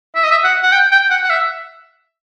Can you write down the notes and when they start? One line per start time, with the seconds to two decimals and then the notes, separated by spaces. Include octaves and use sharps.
0.15 E5
0.24 D#5
0.31 E5
0.44 F#5
0.63 F#5
0.72 G5
0.92 G5
1.10 F#5
1.23 F#5
1.30 E5